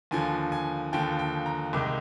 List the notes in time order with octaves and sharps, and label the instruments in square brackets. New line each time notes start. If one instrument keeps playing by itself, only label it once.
[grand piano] D#2 D3 F3 G#5
G#5
D#2 D3 F3 G5
G5
A#5
C2 C3 D#3 G#3 D#4 D6